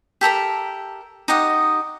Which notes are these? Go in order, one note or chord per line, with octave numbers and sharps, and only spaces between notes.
G4 A4 A#4 E5
D#4 G4 D#5 F#5